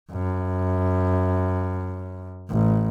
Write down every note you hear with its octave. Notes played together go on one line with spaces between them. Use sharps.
F#2
A1